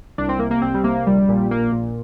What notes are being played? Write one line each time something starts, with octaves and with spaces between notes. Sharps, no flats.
C2 D4
C4
C3 A#3
A#3
C2 C4
G3
C3 A#3
A#1 G3
A#2
A#1 A#3
A#2